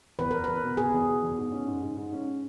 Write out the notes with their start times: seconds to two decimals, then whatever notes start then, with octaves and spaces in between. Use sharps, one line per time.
0.19 E2 B4
0.31 E2 A#4
0.44 E2 B4
0.63 B2
0.77 B2 G#4
0.93 E2
1.08 B2
1.23 E2
1.38 G#2
1.52 C#4
1.68 G#2
1.82 G#2
1.97 G#2
2.13 C#4